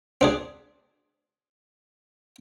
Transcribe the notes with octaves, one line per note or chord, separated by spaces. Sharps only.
C4 D4 G#4